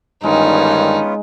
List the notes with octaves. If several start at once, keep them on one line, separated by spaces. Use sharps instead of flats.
G2 D3 D#3 G#3 B3 C#4 D#4 F4